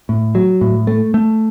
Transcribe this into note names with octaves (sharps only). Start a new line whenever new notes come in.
A2
F#3
A2
A3
A3